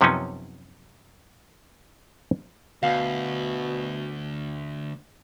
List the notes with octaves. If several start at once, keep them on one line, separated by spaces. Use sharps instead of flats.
F#2 C3 F3 B3 C#4 D#4
D2 B2 F5